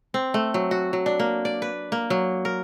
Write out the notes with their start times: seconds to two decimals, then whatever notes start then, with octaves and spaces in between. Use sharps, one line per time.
0.14 C4
0.34 A3
0.54 F#3
0.71 F#4
0.93 F#3
1.06 D4
1.20 A#3
1.45 D5
1.62 B4
1.92 A#3
2.10 F#3
2.45 A#4